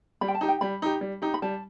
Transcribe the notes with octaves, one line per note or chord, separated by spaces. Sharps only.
G3 B5
G5
A5
D#4 G4
G5
G3 B5
D#4 G4
G3
D#4 G4
B5
G3 A5